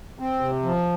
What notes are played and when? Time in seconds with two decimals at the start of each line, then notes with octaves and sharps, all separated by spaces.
0.19 C4
0.41 C3
0.63 F3